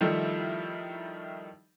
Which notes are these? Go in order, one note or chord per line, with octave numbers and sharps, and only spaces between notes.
D#3 F3 G3 A3 D#4 E4